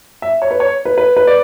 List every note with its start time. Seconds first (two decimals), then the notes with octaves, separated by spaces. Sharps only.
0.22 E5
0.42 C#5
0.51 B4
0.60 C#5
0.85 B4
0.98 B4
1.17 B4
1.27 D5